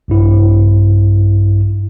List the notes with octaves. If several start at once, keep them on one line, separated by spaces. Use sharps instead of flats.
A#1 G2 E4